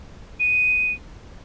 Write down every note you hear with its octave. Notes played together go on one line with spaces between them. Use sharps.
D#7